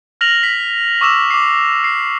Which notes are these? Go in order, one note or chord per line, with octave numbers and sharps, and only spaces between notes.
F6 A#6 F7 F#7
B6
C#6 D6 E6 E7
D6 C7
C7